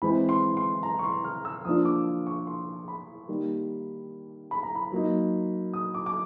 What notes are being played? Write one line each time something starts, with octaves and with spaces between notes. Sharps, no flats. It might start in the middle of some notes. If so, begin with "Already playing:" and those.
E3 G#3 C4 B5
C6
C6
A#5
C#6
C6
F6
E6
F3 A#3 D4 F4 D#6
D6
C#6
C6
B5
D#3 G3 A#3
B5
A#5
B5
F#3 A#3 D#4
D#6
D6
D6